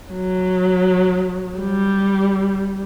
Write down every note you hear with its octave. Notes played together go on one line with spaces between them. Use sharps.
F#3
G3